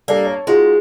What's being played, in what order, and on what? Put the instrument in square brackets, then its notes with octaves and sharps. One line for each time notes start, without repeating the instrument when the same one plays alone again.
[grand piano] G3 D4 A4 [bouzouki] A#3
[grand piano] C#5 A5
[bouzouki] G#3 [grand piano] D#4 F4 F#4